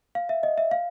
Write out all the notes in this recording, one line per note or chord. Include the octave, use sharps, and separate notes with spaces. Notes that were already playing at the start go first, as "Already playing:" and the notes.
F5
E5
D#5
E5
F5